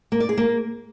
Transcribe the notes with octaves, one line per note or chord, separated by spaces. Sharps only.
A#3
D5
G#4
A#3